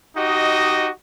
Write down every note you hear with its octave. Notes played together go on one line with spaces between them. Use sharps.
D#4 F#4 G4 D#5